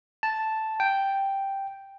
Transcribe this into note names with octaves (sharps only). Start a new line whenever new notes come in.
A5
G5